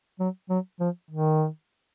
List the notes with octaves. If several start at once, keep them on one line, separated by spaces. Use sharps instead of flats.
F#3
F#3
F3
D#3